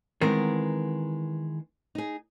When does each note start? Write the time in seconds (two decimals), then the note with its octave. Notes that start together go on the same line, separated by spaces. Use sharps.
0.21 D#3 E3 G#3 B3 C4 A#4
1.95 D#4 G#4